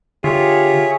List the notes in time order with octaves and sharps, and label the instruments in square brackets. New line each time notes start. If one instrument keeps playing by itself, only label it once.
[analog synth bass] D3 [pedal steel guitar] F4 [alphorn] G4 [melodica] G#4 C#5 E5